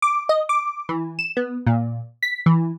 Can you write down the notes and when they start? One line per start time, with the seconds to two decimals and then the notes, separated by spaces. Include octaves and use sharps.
0.02 D6
0.29 D#5
0.49 D6
0.89 E3
1.19 E7
1.37 B3
1.67 A#2
2.23 B6
2.46 E3